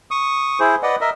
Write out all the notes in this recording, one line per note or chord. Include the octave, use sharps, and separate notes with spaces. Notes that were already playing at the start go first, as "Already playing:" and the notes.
C#6 D#6
E4 G#4 C5
B4 D5 D#5 F#5
A#4 D#5 E5